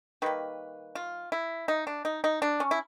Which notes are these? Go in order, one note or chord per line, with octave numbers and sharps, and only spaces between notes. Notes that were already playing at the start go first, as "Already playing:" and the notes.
D#3 G3 A#3 B4
F4
E4
D#4
D4
D#4
D#4
D4
C#4
E4